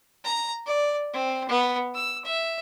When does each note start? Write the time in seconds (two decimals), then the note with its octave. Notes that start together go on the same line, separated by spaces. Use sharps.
0.25 A#5
0.67 D5
1.14 C4
1.49 B3
1.94 E6
2.25 E5